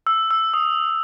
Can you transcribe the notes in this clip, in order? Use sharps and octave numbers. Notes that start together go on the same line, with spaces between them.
E6
E6
D#6